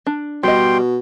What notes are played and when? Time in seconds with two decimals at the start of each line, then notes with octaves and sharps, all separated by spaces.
0.07 D4
0.43 B2 G3 D#5 G5 C6